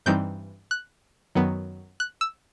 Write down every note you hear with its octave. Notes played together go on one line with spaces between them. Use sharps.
G2 E3 G3 C4 D#4 G6
F#6
F#2 D#3 F#3 B3
F#6
E6